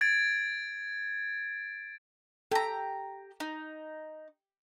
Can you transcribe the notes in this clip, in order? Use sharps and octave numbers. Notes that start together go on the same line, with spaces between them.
G#6 A6 D7
G4 A4 A#5
D#4